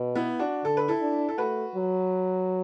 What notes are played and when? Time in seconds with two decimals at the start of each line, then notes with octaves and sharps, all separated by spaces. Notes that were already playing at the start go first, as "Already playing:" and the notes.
Already playing: B2
0.15 B3 E4
0.39 D4 F#4
0.64 D3 A4
0.77 B4
0.88 E4 A4
1.01 D4
1.29 A4
1.38 A3 F#4 B4
1.76 F#3